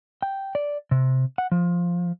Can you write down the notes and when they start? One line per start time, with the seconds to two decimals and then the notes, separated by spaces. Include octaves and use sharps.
0.22 G5
0.55 D5
0.91 C3
1.38 F#5
1.52 F3